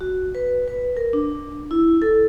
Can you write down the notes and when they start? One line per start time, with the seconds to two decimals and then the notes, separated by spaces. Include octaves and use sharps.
0.01 F#4
0.35 B4
0.68 B4
0.97 A#4
1.13 D4
1.71 E4
2.02 A4